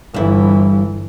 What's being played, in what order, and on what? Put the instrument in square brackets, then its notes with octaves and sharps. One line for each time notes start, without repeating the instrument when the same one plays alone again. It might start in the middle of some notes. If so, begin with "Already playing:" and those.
[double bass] G1 E3 [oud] G2 E4